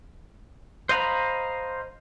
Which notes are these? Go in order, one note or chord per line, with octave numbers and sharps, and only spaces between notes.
C5 D#5 F5 A#5 B5